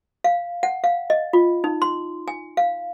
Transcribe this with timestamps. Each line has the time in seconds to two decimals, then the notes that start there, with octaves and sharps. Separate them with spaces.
0.24 F5
0.63 F#5
0.84 F5
1.10 D#5
1.33 F4
1.64 D#4
1.82 C6
2.28 G#5
2.57 F5